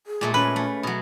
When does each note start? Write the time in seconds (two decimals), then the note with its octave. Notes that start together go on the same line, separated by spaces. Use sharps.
0.07 G#4
0.21 A#2 G#3 A3
0.34 C#4 B4
0.56 A3
0.83 B2 F#3